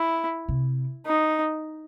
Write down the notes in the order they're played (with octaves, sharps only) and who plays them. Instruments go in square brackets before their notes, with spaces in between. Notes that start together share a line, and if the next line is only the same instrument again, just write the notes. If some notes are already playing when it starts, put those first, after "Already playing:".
Already playing: [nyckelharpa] E4
[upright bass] C3
[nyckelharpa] D#4